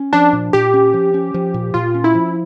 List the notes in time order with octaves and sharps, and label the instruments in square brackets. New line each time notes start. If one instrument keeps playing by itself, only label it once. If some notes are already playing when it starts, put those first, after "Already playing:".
Already playing: [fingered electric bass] C#4
[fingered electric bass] F3 [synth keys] D4
[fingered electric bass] A#2
[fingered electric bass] A#2 [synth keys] G4
[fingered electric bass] C#4
F3
C#4
F3
A#2
[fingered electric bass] A#2 [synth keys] F4
[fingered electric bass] C#4
[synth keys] E4
[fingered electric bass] F3